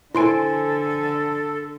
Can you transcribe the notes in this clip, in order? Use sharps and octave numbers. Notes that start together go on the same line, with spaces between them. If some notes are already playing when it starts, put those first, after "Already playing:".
D3 E4 A4 C5 G#5 C6 D7